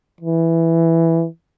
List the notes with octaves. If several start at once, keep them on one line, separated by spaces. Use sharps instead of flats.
E3